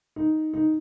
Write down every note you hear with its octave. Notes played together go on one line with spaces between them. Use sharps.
D#4
D#4